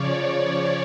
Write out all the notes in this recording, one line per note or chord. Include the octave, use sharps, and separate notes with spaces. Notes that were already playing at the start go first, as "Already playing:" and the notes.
Already playing: C#3 F3 C#5 D5
C#5